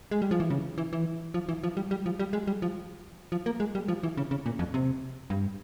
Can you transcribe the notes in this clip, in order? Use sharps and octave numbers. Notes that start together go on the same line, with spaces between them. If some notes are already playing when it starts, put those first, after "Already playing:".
G#3
G3
F3
E3
C#3
E3
E3
F3
E3
F3
G3
G3
F3
G3
G#3
G3
F3
F3
A#3
G#3
G3
F3
E3
C#3
C#3
A#2
F2
C3
G2